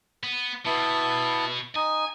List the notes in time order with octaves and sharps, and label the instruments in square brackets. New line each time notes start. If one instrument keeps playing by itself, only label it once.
[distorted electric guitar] B3
[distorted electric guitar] B2 [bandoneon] B3 E4 A5
[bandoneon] D#4 [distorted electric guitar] G#5